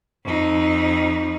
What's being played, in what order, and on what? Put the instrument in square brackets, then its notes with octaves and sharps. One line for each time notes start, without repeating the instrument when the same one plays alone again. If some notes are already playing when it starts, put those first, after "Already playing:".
[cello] F2 D#4